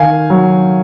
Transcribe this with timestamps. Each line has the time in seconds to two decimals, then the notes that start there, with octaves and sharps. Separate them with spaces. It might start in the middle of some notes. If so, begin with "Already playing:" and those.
Already playing: D#3 F5 G#5
0.30 F#3